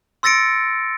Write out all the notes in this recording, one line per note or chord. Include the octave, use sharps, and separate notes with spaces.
C6 E6 A6 A#6 C#7 D7